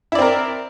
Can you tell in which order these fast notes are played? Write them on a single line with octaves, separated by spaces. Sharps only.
E4 D5 C4 A#4